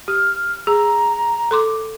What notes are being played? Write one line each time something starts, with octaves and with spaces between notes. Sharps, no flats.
G4 F6
G#4 A#5
A4 C6 D6